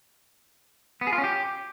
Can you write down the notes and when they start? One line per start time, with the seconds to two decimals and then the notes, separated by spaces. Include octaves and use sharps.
1.01 B3
1.07 G#4
1.13 F4
1.18 C#4
1.24 G4